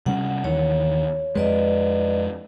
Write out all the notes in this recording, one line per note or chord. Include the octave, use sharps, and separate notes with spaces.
C3 G3 C#4 F#5
D#2 D#3 E3 C#5
F2 G#3 B4 D5 D#5